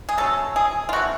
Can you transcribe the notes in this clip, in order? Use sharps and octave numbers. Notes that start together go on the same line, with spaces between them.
G#4
F#3 A3 C#4 A4
G#4
F4
E3 A3 C4 F#4